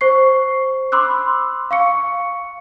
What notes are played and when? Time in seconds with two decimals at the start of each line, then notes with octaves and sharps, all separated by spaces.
0.01 C5 C#6 C7
0.92 B5 C6 D6 E6 F#6
1.71 F5 C#6 C#7